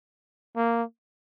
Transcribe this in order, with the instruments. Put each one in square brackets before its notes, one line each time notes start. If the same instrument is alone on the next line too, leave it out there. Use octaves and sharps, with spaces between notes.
[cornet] A#3